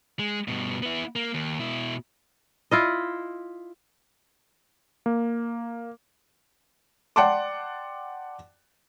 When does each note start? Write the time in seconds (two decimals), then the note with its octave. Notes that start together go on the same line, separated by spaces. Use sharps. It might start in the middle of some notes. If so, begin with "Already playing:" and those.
0.19 G#3
0.48 G2 B2
0.82 B3 E4
1.16 A#3
1.34 D#2
1.59 B2 E4
2.71 E4 F4 D#5
5.06 A#3
7.16 D5 F#5 G5 A5 C6 D6